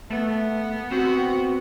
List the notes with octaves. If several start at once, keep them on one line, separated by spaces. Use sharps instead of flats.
A3 B3
C4 F#4